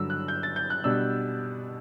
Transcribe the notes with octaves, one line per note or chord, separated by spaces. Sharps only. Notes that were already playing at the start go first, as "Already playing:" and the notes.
Already playing: G2 D3 F#3 E6
F#6
G6
A6
G6
F#6
B2 G3 D4 E6